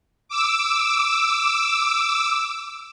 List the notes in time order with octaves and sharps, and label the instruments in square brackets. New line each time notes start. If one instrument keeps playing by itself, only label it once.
[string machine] D6 E6